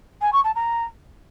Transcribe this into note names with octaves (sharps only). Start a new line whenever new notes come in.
G#5
C#6
A5
A#5